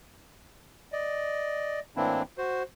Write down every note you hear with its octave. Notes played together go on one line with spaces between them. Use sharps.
D5 D#5
A2 E3 A#3 C4 D4 E4
F#4 C5